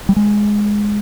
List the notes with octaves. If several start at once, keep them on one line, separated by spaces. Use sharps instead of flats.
G3
G#3